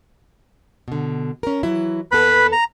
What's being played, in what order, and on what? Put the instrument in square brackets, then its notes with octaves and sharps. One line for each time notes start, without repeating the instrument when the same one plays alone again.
[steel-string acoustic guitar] B2 D3
C#4 A#4
E3 F#3 E4
[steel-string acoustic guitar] D#2 B3 A4 [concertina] B4 B5
[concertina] A#5